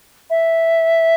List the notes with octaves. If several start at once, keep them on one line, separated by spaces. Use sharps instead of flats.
E5